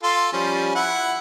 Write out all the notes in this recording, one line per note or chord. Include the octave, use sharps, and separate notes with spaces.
F4 A4 C6
F3 G3 C#4
E4 F#5